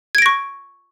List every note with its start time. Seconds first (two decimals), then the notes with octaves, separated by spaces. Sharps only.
0.15 G#6
0.18 D7
0.22 A#6
0.26 C#6